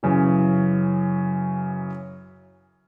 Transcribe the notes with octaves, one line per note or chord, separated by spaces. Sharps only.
F#2 C#3 E3